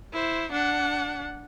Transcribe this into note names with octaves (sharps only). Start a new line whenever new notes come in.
E4 C5
D4 F#5